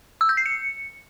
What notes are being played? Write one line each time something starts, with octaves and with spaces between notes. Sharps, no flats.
E6
G6
C7
C#7